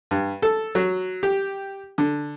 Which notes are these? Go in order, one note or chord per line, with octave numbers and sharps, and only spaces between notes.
G2
A4
F#3
G4
D3